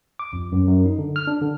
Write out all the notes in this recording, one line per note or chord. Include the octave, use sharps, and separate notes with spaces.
D6
F2
F#2
F#2
D#4
D3
F6
D4
D3